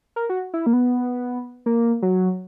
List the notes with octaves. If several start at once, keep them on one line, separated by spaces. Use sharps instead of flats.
A#4
F#4
E4
A#3
B3
A#3
F#3